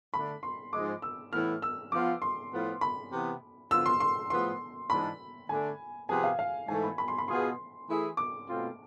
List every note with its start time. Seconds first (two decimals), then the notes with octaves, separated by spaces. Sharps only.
0.13 D3 A3 D4 B5
0.43 C6
0.73 G#2 F3 G#3 D6
1.02 E6
1.32 A2 E3 B3 E4 F6
1.62 E6
1.92 F3 B3 F4 D6
2.22 C6
2.52 A2 F3 B3 F4
2.81 B5
3.11 C3 E3 B3
3.71 D3 F3 B3 F4 E6
3.86 C6
4.00 C6
4.30 A2 F3 B3 F4 G#4 C6
4.89 G#2 E3 G#3 D4 B5
5.49 D3 A3 D4 G#5
6.08 C3 F3 B3 F4 G#4 G#5
6.24 F5
6.39 F5
6.68 G#2 E3 A3 G#5
6.83 B5
6.98 B5
7.08 C6
7.18 B5
7.28 B2 B3 F4 G#4 C6
7.88 E3 A3 E4 G#4
8.17 D6
8.48 B2 A3 C4 F4